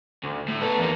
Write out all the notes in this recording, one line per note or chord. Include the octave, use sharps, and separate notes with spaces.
D2
A2
B3 A4
E2 A#3